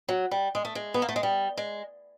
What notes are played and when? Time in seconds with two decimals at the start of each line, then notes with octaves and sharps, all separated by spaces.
0.08 F#3
0.31 G3
0.55 G#3
0.65 A3
0.75 G#3
0.94 B3
1.02 A#3
1.09 A3
1.16 G#3
1.23 G3
1.57 G#3